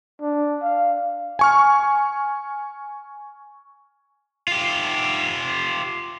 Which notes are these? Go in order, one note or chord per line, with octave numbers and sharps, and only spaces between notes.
D4
F5
G#5 C#6 F6
F4 G4